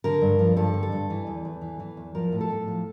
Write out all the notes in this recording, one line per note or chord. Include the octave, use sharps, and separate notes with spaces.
D3 A#4
G2
F3
G2 A4
D3
A4
G2
E3
E2
E2
E3
E3
E2
F3 A#4
A2
A4
A2
F3